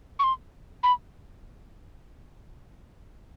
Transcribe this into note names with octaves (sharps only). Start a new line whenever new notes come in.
C#6
C6
B5